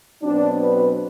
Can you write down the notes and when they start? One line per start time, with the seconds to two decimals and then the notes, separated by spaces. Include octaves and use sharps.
0.22 B2 F#3 C4 D4
0.60 B4